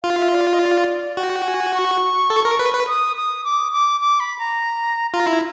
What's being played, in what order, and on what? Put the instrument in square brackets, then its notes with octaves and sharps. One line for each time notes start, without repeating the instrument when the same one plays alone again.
[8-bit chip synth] F4 [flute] F5
[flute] E5
D5
D#5
D5
[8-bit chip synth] F#4 [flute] G5
[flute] G#5
C#6
[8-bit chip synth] A4
A#4
B4
B4
[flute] D#6
D#6
D6
D6
D6
B5
A#5
[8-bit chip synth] F4 [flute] A#5
[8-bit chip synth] E4